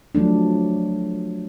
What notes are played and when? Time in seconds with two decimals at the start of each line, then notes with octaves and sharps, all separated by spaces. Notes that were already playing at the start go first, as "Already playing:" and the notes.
0.15 F3 F#3 A3 D4